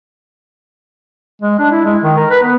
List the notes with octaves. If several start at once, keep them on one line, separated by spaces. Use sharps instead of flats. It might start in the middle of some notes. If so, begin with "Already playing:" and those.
G#3
D4
E4
G#3
D#3
A#4
B4
B3